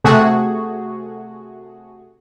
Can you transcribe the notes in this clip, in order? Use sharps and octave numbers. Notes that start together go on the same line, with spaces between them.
C3 A3 F#4 G#4